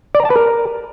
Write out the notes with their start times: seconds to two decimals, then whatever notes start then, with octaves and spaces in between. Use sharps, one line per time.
0.15 D5
0.20 A#5
0.25 A5
0.30 B4
0.36 A#4